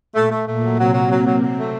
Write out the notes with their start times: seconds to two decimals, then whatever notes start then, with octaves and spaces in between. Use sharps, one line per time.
0.15 A#2 A3 A#3
0.30 A3
0.46 A#2 A3 A#3
0.62 F#3
0.78 C3 F#3 C4
0.93 F#3
1.10 F#3
1.25 F#3
1.41 C3 F#3 C4
1.57 A3